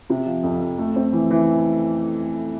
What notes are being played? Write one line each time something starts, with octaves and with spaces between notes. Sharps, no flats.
C3
F3
F2
F2
A3
C4
E3
E3